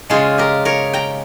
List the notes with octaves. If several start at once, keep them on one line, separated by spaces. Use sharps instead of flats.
C#3 G#3 C#4 F4 G#4
G4 A#4
A#4 C#5
G5 A#5